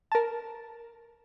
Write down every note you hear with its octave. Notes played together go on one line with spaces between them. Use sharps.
A#4 A5